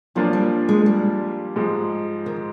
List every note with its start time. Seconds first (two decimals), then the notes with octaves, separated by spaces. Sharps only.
0.15 A#2 F3 F#3 A#3 D4 F4
0.33 G3
0.69 G#3
0.86 G3
1.56 G#2 F3 G#3
2.26 D#3